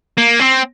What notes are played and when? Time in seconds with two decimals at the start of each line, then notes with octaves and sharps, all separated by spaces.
0.18 A#3
0.39 C4